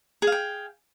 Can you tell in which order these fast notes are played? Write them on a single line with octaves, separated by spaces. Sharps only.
G#4 F5 G5